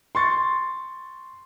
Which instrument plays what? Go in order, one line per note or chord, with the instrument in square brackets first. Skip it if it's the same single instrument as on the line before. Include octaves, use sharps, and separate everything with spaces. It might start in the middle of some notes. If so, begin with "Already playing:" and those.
[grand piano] C6 C#6 A6